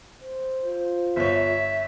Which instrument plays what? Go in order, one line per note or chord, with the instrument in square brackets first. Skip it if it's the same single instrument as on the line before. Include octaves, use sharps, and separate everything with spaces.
[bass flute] C5
[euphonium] F4
[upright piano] G1 C#5 [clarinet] E5